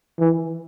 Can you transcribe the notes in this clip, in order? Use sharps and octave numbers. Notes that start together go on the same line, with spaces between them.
E3